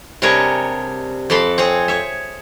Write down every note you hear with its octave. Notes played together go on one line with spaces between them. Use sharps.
C3 G3 D4 G#4 A#4 C#5
F2 D5 A5 B5 C6
C4 G#4 C#5
C#5 E5